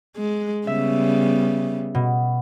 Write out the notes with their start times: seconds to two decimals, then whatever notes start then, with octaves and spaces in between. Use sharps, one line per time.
0.17 G#3
0.67 C#3 G3 B3 E5
1.95 B2